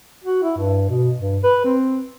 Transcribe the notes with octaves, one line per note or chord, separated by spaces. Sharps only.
F#4
E4
G2
B2
G2
B4
C4